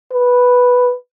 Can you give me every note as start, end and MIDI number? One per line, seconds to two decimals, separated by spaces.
0.13 0.94 71